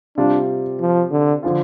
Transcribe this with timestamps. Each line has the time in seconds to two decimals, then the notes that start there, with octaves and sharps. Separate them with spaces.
0.17 C3 G3 D4 F4
0.81 F3
1.12 D3
1.43 D3 F3 D4 F4